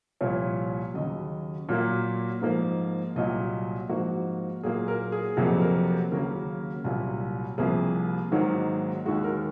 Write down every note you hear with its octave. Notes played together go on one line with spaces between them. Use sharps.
C2 A#2 F3 C#5
D#2 C#3 F#3 D#5
A#2 F#3 A#3
G#2 F3 A#3
C2 A#2 F#3 D#5
G#2 F3 A#3 F#4
A#2 F#3 A#3 G#4
A#4
G#4
F2 C3 F#3 A#3 G#4
A#4
D#2 C#3 F#3 A#3 A#4
C2 A#2 F#3
C2 C3 F3 A#3 G#4
G#2 D#3 F#3 A#3
D#2 D#3 G#3 F#4
A#4